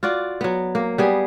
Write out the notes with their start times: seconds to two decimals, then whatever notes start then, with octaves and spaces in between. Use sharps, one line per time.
0.03 F4 F#4 D5
0.41 F#3 B3
0.75 A#3
0.98 G3 B3 G#4